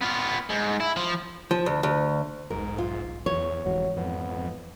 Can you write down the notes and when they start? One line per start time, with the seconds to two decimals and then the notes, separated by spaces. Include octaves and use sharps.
0.01 B3 F4
0.50 G#2
0.80 E4
0.96 F3
1.51 F3
1.66 D2
1.83 D2
2.50 E1 B1 G#2 A#4
2.78 F4
3.26 E2 C#5
3.65 F1 G#2 E3 F#3
3.97 F2 B3